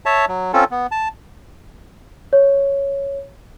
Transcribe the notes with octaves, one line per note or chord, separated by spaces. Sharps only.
C#5 E5 A5
F#3
C4 C#4 F4 A4
B3
A5
C#5